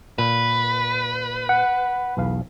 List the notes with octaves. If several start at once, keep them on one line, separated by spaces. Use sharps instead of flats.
A#2 B4
F#5
B1 E2 F5